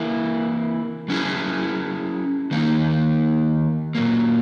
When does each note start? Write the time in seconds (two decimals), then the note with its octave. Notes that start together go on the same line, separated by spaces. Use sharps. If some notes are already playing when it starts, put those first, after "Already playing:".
Already playing: E3 A#3 E4
1.08 F#3 C#4 E4 G#4
2.51 D#3 A#3 D#4
3.95 A#2 F#3 A#3